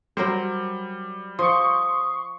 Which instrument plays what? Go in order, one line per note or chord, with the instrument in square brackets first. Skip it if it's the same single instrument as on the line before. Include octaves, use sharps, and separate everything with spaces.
[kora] F#3 A#4 C5 [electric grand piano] G3
[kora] F3 [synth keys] C6 C#6 [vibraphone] D#6